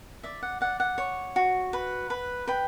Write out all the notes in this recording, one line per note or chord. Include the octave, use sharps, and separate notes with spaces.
D5 E5
F#5
D5 F#5
F#5
C#5
F#4
B4
B4
B4 G5